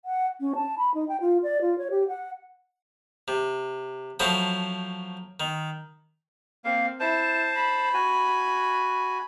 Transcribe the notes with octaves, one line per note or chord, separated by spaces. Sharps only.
F#5
C#4
A5
B5
D#4
G5
F4
D5
F4
C#5
G4
F#5
C3
F3 F#3 A3 C4 B5 D#6
D#3
A#3 C4 F5
E4 C5 A5
B5
F#4 G#5